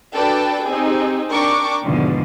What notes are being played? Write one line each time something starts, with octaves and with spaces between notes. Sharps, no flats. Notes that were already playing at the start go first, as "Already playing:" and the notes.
D4 F#4 A4 B4 D5 G5
C4 D#4 G4 G#4
D4 A#4 G5 C#6 D6
E2 G#2 B2 D3 D#3 F3